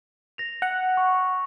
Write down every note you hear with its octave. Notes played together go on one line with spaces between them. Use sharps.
A#6 F7
F#5
C#6